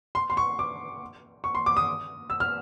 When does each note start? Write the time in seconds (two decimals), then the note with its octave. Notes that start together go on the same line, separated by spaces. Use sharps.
0.15 C6
0.30 C6
0.37 C#6
0.59 D6
1.44 C#6
1.55 C6
1.66 D6
1.77 D#6
2.30 E6
2.40 F6